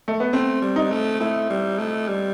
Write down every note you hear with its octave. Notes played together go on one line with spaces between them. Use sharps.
A3
B3
A3 C4
G3
D#4
A3
A3 E4
G3
A3
G3